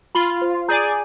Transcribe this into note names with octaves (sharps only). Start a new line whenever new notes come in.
F4 B5 F#7 G7
C5
G#4 D5 G#5 A#5 G6